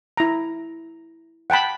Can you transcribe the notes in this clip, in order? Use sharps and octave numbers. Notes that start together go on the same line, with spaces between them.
E4 A#5
F#5 G5 A5 B5